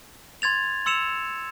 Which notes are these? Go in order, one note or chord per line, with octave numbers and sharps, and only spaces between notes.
C6 G#6 A6 F7
C6 E6 C#7 E7 F7